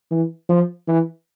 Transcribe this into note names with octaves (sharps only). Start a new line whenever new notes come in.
E3
F3
E3